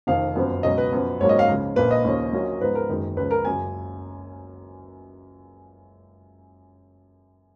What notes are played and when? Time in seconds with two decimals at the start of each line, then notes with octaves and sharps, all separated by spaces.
0.07 F1 F2 D#3 F5
0.35 F#1 F#2 F3 B3
0.63 C#2 B2 F#3 C#4 D#5
0.78 B4
0.92 F#2 F3 B3
1.20 G#1 G#2 F#3 A#3 C#4 C#5
1.29 D#5
1.39 F5
1.48 C#2 C#3 F3
1.76 A#1 A#2 F3 A#3 B4
1.91 D#5
2.04 D#2 C#3 F3 A#3 C#4
2.32 A#1 A#2 F#3 A#3 C#4
2.61 G#2 F3 B3 D#4 B4
2.75 A#4
2.89 F#1 F#2 D#3 G#3 D#4
3.17 C#2 C#3 F3 B4
3.31 A#4
3.45 F#1 F#2 C#3 G#5